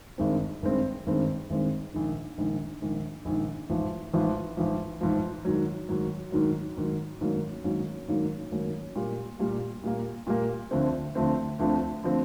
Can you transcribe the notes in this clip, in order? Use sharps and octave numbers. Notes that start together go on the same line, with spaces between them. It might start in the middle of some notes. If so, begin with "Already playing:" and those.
G#1 G2 D#3 G#3 C4
G#1 G2 D#3 G#3 C4
G#1 G2 D#3 G#3 C4
G#1 G2 D#3 G#3 C4
A#1 G#2 D#3
A#1 G#2 D#3
A#1 G#2 D#3
A#1 G#2 D#3
A1 G#2 F3
A1 G#2 F3
A1 G#2 F3
A1 G#2 F3
G#2 D#3 F#3
G#2 D#3 F#3
G#2 D#3 F#3
G#2 D#3 F#3
G#2 D#3 F#3 A#3 C#4
G#2 D#3 F#3 A#3 C#4
G#2 D#3 F#3 A#3 C#4
G#2 D#3 F#3 A#3 C#4
A#2 G3 A#3
A#2 G3 A#3
A#2 G3 A#3
A#2 G3 A#3
D2 D3 F3 A3 C4
D2 D3 F3 A3 C4
D2 D3 F3 A3 C4
D3 F3 A3 C4